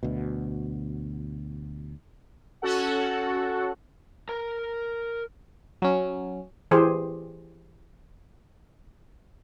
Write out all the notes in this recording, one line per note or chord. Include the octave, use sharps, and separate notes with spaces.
D2 B2
C#4 F#4 A4 F#5
A#4 A#5
F#3 C#4
E3 G4 G#4 C5